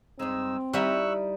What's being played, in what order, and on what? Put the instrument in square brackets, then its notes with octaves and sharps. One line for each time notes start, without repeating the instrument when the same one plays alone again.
[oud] G2 G#3 [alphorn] C4 [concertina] D#4 E6
[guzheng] G3 [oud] D#4 E4 E5 [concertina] C#6 E6 F#6